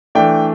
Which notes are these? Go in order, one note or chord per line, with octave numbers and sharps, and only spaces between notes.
E3 A3 D4 G5